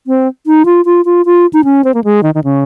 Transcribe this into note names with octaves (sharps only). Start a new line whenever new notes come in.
C4
D#4
F4
F4
F4
F4
D#4
C#4
C4
A#3
G#3
D#3
D#3
C#3